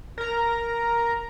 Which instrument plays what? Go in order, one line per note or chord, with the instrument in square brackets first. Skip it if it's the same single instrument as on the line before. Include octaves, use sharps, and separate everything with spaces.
[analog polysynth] A#4 A#5